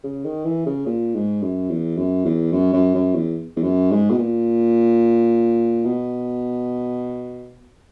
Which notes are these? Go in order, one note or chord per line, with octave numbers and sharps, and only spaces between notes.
C#3
D#3
E3
C#3
A#2
G#2
F#2
E2
F#2
E2
F#2
F#2
F#2
E2
E2
F#2
G#2
B2
A#2
B2